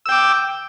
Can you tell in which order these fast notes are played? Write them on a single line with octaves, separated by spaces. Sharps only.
E6 G5 D6